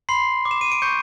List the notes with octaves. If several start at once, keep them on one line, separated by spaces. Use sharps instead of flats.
B5 C6 C7
D6
E7
D#7
D7
C#6 G6 C#7